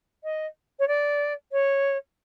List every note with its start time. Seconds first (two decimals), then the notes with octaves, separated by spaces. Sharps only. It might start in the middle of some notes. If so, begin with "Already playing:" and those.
0.24 D#5
0.79 C#5
0.88 D5
1.52 C#5